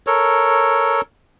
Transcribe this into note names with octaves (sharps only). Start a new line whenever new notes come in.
A4 A#4 C#5